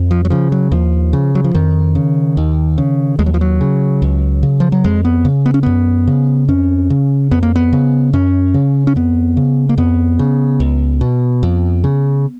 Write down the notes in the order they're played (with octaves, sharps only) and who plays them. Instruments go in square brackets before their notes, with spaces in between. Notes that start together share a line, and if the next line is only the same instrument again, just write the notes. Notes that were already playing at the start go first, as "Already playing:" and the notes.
Already playing: [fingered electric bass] F2
F3
F#3
C#3 F3
F#3
D#2 F3
C#3
F#3
F3
F2 D#3
C#3
D#2
C#3
D#2 G#3
F#3
F3
F#3
C#3
C#2
C#3
F3
F#3
F2 G#3
B3
C#3
B3
C#4
F#2 B3
C#3
F2 C#4
C#3
F2 B3
A#3
B3
C#3
F#2 C#4
C#3
C#4
F2 B3
C#3
A#3
F2 B3
C#3
C#2
B2
F2
C#3